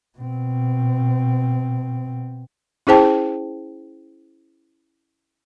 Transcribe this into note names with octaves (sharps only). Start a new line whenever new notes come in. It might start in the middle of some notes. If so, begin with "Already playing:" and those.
B2 C4
C#4 E4 G#4 C5 G5 A5